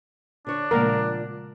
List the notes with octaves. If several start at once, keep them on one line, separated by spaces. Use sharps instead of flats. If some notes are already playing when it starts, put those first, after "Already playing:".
D3 D4 C#5
A#2 C#3 F3 G#3 A3 A#4